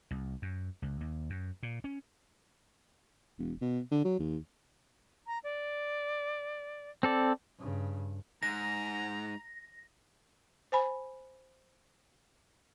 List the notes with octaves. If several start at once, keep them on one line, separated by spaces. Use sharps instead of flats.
C2
F#2
C#2
D#2
F#2
A#2
C#4
E1
B2
D3
F#3
D#2
A#5
D5
C4 A4 D5
G2 C#3
G#2 A#5 A#6
C5 G#5 B5